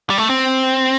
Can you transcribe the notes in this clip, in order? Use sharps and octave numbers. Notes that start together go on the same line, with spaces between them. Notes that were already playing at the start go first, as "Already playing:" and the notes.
G3
A3
C4